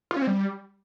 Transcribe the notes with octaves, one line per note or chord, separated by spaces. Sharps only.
F4
C#4
C4
G3